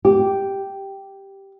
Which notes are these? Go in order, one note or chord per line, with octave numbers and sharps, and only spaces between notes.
G4